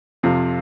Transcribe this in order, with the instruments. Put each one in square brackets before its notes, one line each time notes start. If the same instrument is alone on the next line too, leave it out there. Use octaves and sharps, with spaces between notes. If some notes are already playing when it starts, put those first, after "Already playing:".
[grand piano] F2 C3 F3